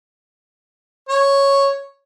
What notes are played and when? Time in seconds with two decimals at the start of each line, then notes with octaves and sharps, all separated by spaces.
1.09 C#5